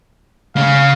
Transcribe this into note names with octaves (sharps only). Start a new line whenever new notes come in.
C#3 C#4 F5